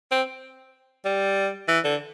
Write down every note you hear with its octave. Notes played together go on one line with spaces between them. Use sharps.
C4
G3
E3
D3